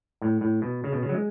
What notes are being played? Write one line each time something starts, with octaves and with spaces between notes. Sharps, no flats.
A2
A2
B2
C#3
B2
C#3
F#3
G#3